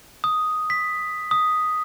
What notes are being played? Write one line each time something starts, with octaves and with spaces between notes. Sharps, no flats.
D#6
B6
D#6